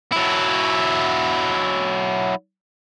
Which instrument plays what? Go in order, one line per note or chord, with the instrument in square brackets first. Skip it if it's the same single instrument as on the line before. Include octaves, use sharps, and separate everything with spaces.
[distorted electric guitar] F#3 E4